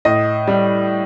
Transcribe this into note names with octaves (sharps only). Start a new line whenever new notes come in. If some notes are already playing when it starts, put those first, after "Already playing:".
A2 D#5
G3